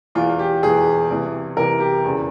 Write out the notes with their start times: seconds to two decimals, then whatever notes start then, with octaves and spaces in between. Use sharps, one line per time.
0.15 E1 E2 E3 F4
0.39 G4
0.63 E1 E2 E3 G#4
1.10 C2 C3 E3
1.57 C2 C3 E3 A#4
1.80 G4
2.04 E1 E2 C#3